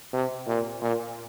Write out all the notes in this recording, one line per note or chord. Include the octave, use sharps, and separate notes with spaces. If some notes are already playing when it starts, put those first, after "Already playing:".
C3
A#2
A#2